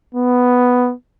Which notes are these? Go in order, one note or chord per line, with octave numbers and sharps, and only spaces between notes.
B3